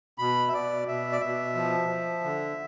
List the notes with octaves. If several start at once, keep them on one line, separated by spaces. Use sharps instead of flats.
B2 B5
E5
B2 D5
B2 E5
D5
B2 E5
F3
F3
D3